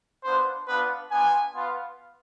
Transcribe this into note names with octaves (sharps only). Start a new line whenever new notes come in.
B3 D4 F4 C5
B3 D4 F4 B4
B3 D4 F4 G#5
B3 F4